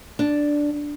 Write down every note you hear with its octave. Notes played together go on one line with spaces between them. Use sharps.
D4